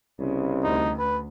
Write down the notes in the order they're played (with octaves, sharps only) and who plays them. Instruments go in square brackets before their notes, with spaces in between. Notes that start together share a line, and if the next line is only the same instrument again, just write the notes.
[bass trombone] C2 [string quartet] C#3
[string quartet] D2 [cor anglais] D#4
[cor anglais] B4